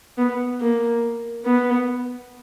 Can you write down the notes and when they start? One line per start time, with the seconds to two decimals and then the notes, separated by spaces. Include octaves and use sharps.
0.18 B3
0.60 A#3
1.46 B3